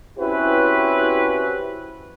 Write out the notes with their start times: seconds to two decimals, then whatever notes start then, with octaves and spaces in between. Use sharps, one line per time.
0.18 C4 C#4 E4 F#4 G4 B4